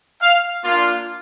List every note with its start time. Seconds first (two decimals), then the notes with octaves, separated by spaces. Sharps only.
0.21 F5
0.62 A#3 D4 F4